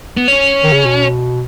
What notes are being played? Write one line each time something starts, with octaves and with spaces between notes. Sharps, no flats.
B3
C#4
D#3
C#3
B2